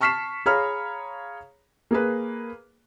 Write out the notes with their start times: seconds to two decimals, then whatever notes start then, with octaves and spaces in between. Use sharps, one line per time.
0.01 A5 C#6 F6 B6 C7 E7
0.46 G#4 C#5 F5 A#5 B5 F6
1.91 A#3 G#4 B4